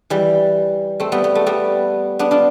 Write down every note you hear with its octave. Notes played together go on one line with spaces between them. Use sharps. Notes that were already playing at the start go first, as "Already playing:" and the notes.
E3 G3
A3 C4
G3 B3
B3
A3
G3 B3
B3 D4
D4 F4